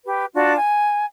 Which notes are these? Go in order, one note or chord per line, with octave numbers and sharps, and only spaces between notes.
G4 B4
D4 F4 F#4
G#5